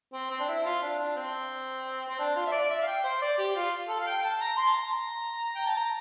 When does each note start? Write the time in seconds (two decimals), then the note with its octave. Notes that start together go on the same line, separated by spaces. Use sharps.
0.13 C4
0.31 C4
0.40 D4
0.48 E4
0.66 F4
0.83 D4
0.99 D4
1.16 C4
2.09 C4
2.19 D4
2.36 F4
2.46 E5
2.52 D5
2.70 E5
2.82 F5
2.87 G5
3.04 C5
3.21 D5
3.38 G4
3.56 F4
3.89 A4
4.00 F5
4.06 G5
4.23 A5
4.41 A#5
4.57 C6
4.66 A5
4.74 A#5
5.56 G5
5.66 A5
5.77 A#5